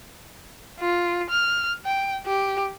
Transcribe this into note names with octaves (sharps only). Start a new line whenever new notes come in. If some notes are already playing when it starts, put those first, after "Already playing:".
F4
F6
G5
G4